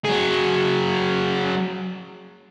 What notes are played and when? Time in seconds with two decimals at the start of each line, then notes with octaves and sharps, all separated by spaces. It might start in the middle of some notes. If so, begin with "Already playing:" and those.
0.05 F#3 G#4